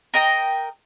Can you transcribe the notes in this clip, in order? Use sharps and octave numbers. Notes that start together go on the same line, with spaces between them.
A#4 D#5 G5 A#5